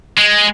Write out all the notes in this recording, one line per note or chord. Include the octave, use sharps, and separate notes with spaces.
G#3